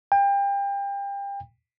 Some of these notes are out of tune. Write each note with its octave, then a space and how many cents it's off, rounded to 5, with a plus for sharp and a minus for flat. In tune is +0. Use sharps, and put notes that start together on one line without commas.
G5 +30